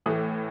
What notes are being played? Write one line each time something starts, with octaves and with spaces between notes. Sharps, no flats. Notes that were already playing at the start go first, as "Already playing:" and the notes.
A2 E3 A3